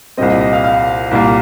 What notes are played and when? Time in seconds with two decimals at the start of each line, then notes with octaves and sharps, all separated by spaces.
0.17 C2 A#2 G3 C4 D#5
0.30 D#5
0.41 D#5
0.53 F5
0.64 F5
1.11 C2 A#2 G3 A#3